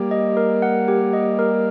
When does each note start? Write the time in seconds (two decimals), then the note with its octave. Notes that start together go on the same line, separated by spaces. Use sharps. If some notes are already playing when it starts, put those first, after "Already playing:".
Already playing: G3 A#3 G4
0.11 D#5
0.37 A#4
0.62 F#5
0.88 G4
1.13 D#5
1.39 A#4